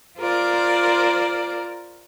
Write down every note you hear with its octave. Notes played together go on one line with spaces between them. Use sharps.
F4 A#4 C5 D5